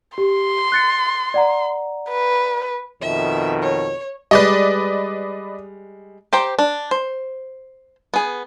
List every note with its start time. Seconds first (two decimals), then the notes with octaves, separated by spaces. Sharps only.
0.18 G4 C6
0.72 F#6 A6 C#7
1.34 D5 F#5 A#5
2.10 B4
3.01 F2 B2 D#3 E5
3.62 C#5
4.31 G3 G#3 B4 D5 D#5
6.33 G4 C5 G5 A#5
6.59 D4
6.91 C5
8.14 B3 G#4